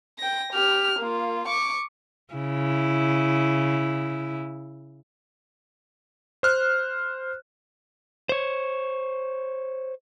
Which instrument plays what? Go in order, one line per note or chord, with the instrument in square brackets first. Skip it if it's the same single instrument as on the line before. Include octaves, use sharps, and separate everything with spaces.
[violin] G5 A#6
G4 F6
A#3 F4
C#6 D6
[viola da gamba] C#3 E4
[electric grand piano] C5 F6 F#6
[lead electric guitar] C5 C#5